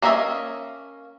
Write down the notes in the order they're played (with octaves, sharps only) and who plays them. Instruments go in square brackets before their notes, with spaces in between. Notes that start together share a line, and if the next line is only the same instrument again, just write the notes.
[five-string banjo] A#3 C#4 D#5 E5